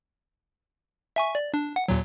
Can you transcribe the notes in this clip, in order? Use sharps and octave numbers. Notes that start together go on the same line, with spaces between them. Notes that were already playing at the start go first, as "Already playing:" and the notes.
E5 G#5 C#6
D5
D4
F#5
D#2 A#2 F#3